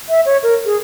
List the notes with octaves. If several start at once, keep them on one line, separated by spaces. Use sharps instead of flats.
E5
C#5
A#4
G#4